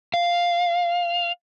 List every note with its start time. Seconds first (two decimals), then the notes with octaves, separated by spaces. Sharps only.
0.14 F5